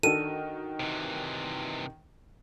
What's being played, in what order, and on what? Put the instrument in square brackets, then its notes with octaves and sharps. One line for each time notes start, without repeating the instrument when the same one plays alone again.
[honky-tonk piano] D#3 F#4 A#4 [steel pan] D4 A4 [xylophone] D#7
[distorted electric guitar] C3 E3